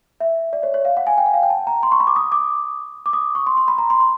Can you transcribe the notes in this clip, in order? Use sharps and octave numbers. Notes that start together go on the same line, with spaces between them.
E5
D5
C#5
C#5
F5
F#5
G#5
G5
F#5
F5
G5
A5
A#5
C6
C#6
B5
D6
D#6
D6
D6
D#6
C#6
C6
C6
B5
A#5
C6
C6